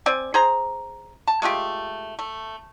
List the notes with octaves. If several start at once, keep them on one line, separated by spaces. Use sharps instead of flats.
C4 D5 G#5
G#4 C5 A#5
A5
G#3 A3 F4 G4
A3